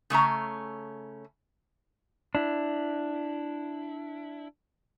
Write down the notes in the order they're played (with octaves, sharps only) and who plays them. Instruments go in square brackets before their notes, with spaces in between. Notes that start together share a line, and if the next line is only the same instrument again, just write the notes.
[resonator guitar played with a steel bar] C#3 A3 C#4 A#5
[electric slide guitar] D4 E4